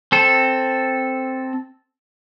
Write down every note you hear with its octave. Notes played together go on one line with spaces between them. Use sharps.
C4 A4